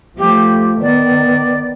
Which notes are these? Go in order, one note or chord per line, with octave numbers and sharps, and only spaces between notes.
F3 A3 G4
D#3 B3 D5